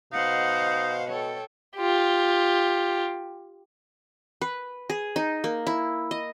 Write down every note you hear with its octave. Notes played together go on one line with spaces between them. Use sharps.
B2 D#4 C5 F5 F#5
A4 C#5 G5
F4 G4
B4
G#4
D#4
A#3
E4
D#5